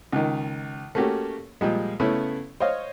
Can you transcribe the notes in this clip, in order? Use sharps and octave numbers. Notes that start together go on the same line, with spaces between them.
C#2 D#3
A3 A#3 C#4 F#4 G4
A#2 F3 G3 G#3
C#3 A3 B3 C#4 E4
C5 C#5 D#5 F5